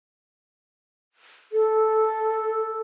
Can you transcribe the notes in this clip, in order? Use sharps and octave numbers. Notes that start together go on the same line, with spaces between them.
A4